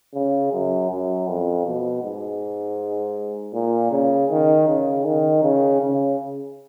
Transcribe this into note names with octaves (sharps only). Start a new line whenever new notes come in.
C#3
F#2
F#2
F2
B2
G#2
A#2
C#3
D#3
C#3
D#3
C#3
C#3